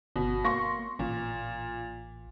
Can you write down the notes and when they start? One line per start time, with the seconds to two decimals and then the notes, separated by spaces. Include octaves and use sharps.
0.16 G1 B2
0.45 A#3 C6 C#6 A#6
0.99 A1 A#2